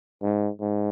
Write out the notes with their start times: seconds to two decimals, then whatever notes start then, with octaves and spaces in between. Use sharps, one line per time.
0.23 G#2
0.61 G#2